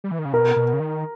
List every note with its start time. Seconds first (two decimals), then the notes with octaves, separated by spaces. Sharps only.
0.04 G3
0.11 E3
0.19 D#3
0.25 C#3
0.33 B2 A#4
0.56 B2
0.73 C#3
0.80 D#3